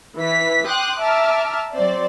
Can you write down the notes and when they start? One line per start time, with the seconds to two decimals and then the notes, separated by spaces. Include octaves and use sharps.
0.17 E3 B6
0.67 G5 C6 D6 D#6 F#6
1.00 E5 A5 A#5 D6 F6
1.75 F#3 C4 C5 D5